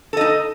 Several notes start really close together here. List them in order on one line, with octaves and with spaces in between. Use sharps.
A4 D#5 D#4